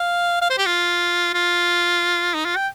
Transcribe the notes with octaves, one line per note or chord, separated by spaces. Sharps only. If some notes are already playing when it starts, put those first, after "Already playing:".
Already playing: F5
F5
C5
G4
F4
F4
D#4
F4
G5